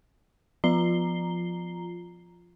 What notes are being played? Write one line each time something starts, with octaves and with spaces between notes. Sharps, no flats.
F3 F4 A#5 C7 G7